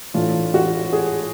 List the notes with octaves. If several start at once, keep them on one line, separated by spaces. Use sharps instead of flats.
A2 E3 A3 D4 F4
F#4
G#4